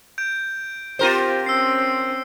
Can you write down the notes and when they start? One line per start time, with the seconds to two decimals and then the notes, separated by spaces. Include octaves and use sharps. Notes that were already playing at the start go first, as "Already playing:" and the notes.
0.18 G6 D7
0.99 C4 F4 G4 A#4 C5
1.46 C4 C#4 E6 C7